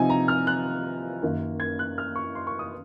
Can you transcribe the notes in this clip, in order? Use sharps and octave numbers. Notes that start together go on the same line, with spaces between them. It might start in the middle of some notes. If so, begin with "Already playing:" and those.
Already playing: C3 F3 C4 D#4 G#5
A#5
F6
F#6
F#2 D#3 A#3
G#6
F#6
F6
C#6
C6
C#6
D#6